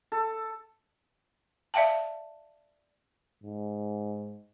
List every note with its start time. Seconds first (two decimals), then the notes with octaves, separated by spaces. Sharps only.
0.12 A4
1.74 D5 E5 F5 G5 A5
3.44 G#2